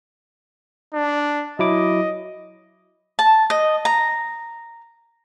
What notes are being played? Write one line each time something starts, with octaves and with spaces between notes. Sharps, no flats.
D4
F#3 E4 D#5 D6
A5
D#5
A#5